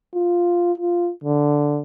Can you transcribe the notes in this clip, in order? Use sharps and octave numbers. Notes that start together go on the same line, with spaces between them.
F4
F4
D3